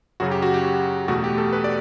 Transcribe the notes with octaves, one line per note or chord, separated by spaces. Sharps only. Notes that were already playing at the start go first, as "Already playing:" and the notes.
F#2 C#3 F#3 F#4
G4
F#4
G4
E2 B2 A3 F#4
G4
A4
B4
D5